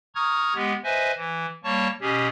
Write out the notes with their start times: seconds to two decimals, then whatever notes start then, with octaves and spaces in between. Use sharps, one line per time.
0.15 A#5 C#6 D#6 F6 G#6
0.55 G#3 B3 G4
0.84 B4 C5 D#5 E5 G#5
1.16 E3
1.64 G3 A#3 C#5 A5 C#6
2.01 B2 C#4 G4 G#4